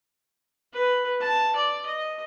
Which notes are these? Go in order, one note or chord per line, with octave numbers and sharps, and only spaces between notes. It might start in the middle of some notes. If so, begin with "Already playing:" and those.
B4
A5
D5
D#5